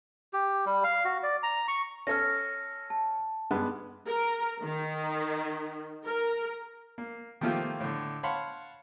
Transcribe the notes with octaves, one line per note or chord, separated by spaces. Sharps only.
G4
G3
F5
F#4
D5
A#5
C#6
C#4 A4 C#5 F6 A#6
A5
G2 G#3 B3
A#4
D#3
A#4
A#3
D#3 F3 A3 A#3 F4 G4
A2 D3
C#5 F5 F#5 A5 B5 C6